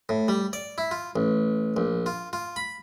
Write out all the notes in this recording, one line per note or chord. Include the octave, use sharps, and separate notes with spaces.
A2
G3
D5
E4
F4
A1
A#1
F4
F4
B5